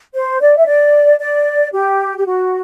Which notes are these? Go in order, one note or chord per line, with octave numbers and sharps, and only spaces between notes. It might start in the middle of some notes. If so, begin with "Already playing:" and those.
C5
D5
E5
D5
D5
G4
G4
F#4